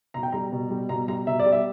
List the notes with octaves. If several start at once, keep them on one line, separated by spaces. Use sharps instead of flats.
B2 A#5
G5
G3 A#5
B2
G3
B2 A#5
G3 A#5
B2 E5
D5
G3
E5